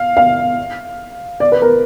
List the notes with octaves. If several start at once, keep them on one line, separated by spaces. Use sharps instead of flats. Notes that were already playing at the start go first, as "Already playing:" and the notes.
Already playing: F5
F5
D5
B4
A#4